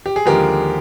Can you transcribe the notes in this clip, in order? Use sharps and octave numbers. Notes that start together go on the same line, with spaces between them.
G4
G#4
D#2 D3 F3 G#3 G4 A#4